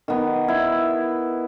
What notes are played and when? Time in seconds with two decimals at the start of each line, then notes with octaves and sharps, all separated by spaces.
0.08 D#3 B3
0.48 E4